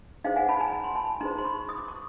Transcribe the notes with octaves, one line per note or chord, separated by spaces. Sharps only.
D#4 G#4 C5 F5 G5
F#5 G#5
A5 B5
G#5 A#5
B5
C6
A5 B5
D#4 G#4 C5 A#5 C6
C6
B5 C#6
D#6
D6
C#6